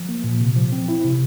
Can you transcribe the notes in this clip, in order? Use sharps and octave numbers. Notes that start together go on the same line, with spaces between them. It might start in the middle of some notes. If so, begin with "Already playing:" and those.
Already playing: F3
A#3
A#2
C3
F3
C4
E4
C3